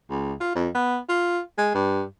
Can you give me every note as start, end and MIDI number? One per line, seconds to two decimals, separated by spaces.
0.10 0.33 37
0.41 0.51 65
0.55 0.69 41
0.75 0.98 59
1.09 1.40 65
1.58 1.71 56
1.75 2.03 43